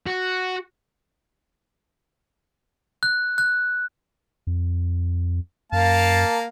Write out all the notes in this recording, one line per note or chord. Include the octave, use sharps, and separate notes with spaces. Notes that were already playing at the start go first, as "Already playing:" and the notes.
F#4
F#6
F#6
F2
F#2 A#3 F5 A5